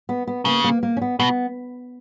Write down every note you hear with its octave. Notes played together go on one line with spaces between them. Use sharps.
B3
B3
C#3 A#3
A#3
A#3
C#4
B3
B2 B3